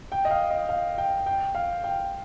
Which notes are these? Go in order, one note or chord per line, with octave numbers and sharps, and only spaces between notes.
G5
D#5
F5
D#5
F5
G5
G5
F5
G5